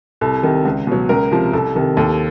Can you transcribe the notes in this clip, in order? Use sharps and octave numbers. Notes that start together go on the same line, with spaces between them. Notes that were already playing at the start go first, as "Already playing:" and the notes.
C2 A4
C3 D#3
C#2
B2 F#3
C#2 A#4
C3 F3
C2 A4
C3 D#3
D#2 A4